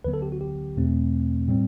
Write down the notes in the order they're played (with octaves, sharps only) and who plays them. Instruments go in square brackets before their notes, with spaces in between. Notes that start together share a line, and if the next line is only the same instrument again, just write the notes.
[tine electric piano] D2 D3 F#3 B3 B4
A4
G4
F#4
G4
E2 B2 A3 C4
A2 G3 C4